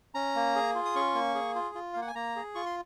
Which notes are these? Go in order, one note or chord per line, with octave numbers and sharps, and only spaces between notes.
C#4 A#5
A#3
G#4
F4
D#6
C#4 C#6
A#3
G#4
F4
F4
F5
A#3
F#5
G#5
A#3 A#5
G#4
F4 C#6
C6